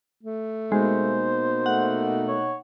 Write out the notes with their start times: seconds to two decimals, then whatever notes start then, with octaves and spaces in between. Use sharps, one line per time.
0.23 A3
0.72 B2 G#3 A#3 D#4 C5
1.66 A3 F#5
2.28 C#5